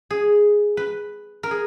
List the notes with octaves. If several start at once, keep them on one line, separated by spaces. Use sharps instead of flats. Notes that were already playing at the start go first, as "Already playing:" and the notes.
G#4
B4
A#4
G#4